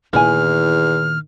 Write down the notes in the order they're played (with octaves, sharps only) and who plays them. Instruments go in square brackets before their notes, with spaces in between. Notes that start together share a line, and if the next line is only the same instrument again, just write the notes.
[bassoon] E2 [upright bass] A#2 D#3 [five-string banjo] E4 G#5 [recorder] F6